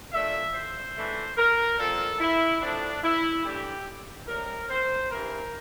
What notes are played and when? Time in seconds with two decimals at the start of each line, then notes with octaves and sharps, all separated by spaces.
0.13 A#2 A3 D4 E5
0.54 C5
0.95 E3 A3 D4
1.37 A#4
1.79 A#2 F3 C4 A4
2.20 E4
2.62 A2 F3 A3 C4 D4
3.04 E4
3.45 E3 A3 D4 G4
4.28 A2 G3 C4 A#4
4.70 C5
5.11 G2 E3 A#3 A#4